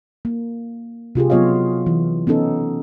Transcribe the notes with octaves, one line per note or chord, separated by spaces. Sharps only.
A#3
C3 F4 G4 G#4
F#3 B3 F4 C#5 D#5 F5
E3
B3 C#4 D#4 A4